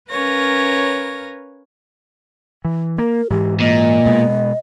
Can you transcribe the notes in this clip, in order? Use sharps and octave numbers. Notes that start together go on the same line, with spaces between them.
C#4 A#4 B4 C#5 F5 A#6
E3
A#3 A#4
G#2 E3 G4
A#2 D#5
B2 G#3 B3